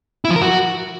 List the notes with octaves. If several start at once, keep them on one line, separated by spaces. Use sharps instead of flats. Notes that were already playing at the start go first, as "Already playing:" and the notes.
E4
F3
A#4
F#4